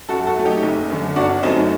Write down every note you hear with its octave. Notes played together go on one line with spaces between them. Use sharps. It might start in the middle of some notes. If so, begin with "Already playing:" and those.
F#2 F#4 A4
F#4 A4
F#3 A3
D#4 G4
F#1
F#2 D3
G1 D4 F#4
F#2 F#3 A3 C4 D#4